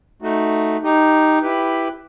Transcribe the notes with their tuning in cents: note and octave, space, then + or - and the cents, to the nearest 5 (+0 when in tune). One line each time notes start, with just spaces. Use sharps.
A3 +0 D#4 +0 F#4 +0
D#4 +0 G4 +0
E4 +0 G4 +0 B4 +0